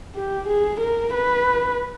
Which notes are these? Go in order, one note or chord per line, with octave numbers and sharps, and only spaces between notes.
G4
G#4
A#4
B4